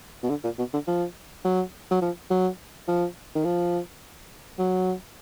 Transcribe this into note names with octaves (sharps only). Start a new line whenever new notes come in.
B2
D3
A#2
B2
D3
F3
F#3
F#3
F3
F#3
F3
D#3
F3
F#3